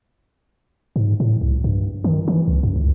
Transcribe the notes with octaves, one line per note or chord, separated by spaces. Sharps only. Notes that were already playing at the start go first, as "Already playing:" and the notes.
G#2
A2
C2
G2
D#3
E3
C2
F#2
C#2